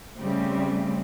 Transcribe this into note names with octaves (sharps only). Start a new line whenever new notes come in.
C#3 G3 A3 C4